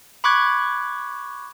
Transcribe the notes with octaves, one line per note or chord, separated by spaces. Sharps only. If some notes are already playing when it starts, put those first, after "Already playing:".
B5 C#6 D6 F#6 G#6